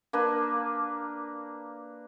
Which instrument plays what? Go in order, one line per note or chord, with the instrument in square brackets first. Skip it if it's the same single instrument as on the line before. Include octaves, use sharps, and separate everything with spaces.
[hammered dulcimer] A#3 D4 B4